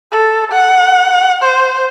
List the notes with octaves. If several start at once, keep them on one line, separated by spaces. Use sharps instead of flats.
A4
F#5
C5